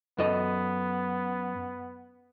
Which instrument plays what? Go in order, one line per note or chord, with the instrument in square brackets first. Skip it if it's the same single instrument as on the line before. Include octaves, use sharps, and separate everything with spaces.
[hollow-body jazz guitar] F#2 A4 D#5 [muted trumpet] B3